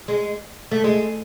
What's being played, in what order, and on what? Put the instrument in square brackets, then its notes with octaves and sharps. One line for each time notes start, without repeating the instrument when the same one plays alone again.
[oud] G#3
A3
G#3